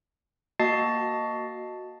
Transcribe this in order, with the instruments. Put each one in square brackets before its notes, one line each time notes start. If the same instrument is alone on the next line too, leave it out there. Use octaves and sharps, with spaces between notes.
[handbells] A#3 F#4 D#5 A5 A6 C7